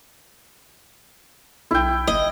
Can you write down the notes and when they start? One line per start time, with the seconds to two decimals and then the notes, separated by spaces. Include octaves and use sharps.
1.71 B1 E4 G5
2.08 F#1 D#5